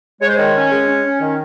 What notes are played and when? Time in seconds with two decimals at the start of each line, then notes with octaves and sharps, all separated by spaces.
0.21 G#3 C#5
0.28 C5
0.36 D#3 C#5
0.54 C#4
0.72 G#3
0.88 C#4
1.04 C#4
1.20 D#3